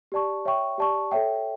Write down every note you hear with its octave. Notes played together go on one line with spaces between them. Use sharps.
G4 D5 A5 C#6
C#5 E5 G5 C#6
G4 D5 A5 C#6
A4 C#5 E5 G5